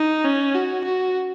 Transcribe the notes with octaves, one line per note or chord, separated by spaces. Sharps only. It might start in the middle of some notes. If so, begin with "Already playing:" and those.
Already playing: D#4
C#4
F#4
F#4